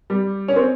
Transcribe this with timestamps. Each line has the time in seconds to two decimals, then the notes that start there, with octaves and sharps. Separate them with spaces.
0.10 G3
0.48 C#4
0.56 C4